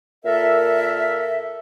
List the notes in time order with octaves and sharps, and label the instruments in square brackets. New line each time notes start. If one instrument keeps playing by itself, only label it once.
[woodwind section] A#2 A4 A#4 E5